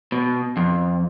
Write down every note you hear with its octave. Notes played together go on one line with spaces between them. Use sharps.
B2
F2